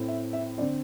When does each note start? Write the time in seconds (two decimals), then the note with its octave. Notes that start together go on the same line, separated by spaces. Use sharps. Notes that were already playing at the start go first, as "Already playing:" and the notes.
Already playing: A2 A3 C4
0.08 E5
0.33 E5
0.58 C4 D5
0.61 D3